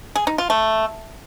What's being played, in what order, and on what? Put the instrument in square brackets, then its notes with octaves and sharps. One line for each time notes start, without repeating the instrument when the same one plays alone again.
[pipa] G#4
D#4
F4
A3